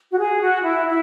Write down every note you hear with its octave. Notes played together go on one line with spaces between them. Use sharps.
F#4
G#4
F#4
E4
E4